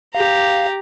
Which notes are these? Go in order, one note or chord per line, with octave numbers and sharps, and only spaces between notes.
G4 F5 A#5